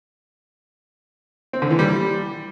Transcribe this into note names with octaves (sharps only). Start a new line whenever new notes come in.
C4
D3
E3
G3